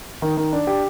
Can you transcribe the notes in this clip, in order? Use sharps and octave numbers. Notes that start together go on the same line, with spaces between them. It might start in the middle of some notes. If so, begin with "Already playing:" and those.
D#3
D#3
D4
G4